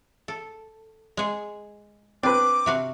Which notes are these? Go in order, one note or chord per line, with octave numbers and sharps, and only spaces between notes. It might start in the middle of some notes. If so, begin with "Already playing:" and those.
A4
G#3 G#4
C4 D4 B4 D6
C3 F#4 F5